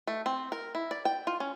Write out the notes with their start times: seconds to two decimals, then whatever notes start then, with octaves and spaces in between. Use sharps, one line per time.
0.07 A3
0.26 C4
0.52 A#4
0.75 E4
0.91 D5
1.05 G5
1.27 F4
1.40 C#4